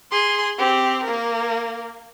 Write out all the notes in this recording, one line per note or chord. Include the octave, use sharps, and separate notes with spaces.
G#4 C6
C4 G4
A#3 A#4